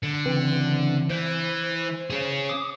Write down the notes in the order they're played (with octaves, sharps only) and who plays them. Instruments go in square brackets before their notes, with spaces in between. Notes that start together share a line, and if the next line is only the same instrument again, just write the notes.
[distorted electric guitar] D3
[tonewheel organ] C#3 E3 C4
[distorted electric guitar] E3 [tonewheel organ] C5
[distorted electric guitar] C#4 G#4
[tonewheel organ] D6 D#6